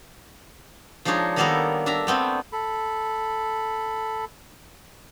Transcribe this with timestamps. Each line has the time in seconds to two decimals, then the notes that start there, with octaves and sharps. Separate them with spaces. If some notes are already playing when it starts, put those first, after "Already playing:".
1.05 F3 G#3 D4 D#4 C#5
1.36 D#3 G3 A#3 B3 A4 A#4
1.86 D4 E5 A#5
2.07 A3 B3 C4 G5
2.52 A4 B5